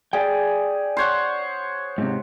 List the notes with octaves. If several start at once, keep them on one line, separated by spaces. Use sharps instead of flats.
G#4 D5 G5
C5 C#5 F#5
G#2 C3